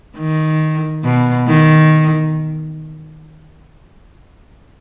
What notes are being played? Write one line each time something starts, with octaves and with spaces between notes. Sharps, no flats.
D#3
B2
D#3